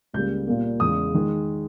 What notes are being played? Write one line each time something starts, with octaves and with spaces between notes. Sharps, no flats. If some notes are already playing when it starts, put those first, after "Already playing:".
C#2 C#3 G3 A#3 G6
A#2 G3 A#3
E2 C#3 G#3 D#6
D#3 G#3